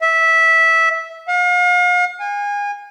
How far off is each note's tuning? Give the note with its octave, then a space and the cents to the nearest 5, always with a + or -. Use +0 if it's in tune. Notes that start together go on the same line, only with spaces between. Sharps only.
E5 -10
F5 +40
G#5 -30